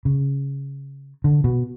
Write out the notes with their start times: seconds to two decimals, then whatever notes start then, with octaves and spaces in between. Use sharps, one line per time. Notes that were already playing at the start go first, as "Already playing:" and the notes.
0.05 C#3
1.24 D3
1.44 B2